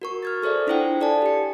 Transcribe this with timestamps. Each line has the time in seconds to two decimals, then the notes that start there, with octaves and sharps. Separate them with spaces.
0.02 F#4 A#4 C#6
0.23 F6 G#6 A6
0.43 G#4 A4 C5 D5 E5
0.67 D4 E4 F4 C5 F#5 G5
1.01 A4 D5 G#5 A5
1.22 G4 C#7